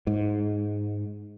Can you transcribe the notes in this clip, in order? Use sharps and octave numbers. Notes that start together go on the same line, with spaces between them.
G#2